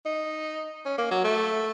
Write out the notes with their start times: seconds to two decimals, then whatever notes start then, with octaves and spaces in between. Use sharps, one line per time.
0.06 D#4
0.85 C#4
0.98 A#3
1.11 F#3
1.24 A3